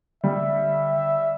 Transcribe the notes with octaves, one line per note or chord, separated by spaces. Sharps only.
D3 G3 E5